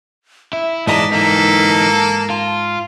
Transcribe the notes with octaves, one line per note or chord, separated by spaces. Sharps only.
E4 E5
G#2 E3 G#3 D5 D#5 A5 A#5 B6
E3 A#3 D#4 A4
A5
F4